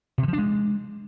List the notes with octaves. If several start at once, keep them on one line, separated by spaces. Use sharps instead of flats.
C3
D3
F3
D4
G#3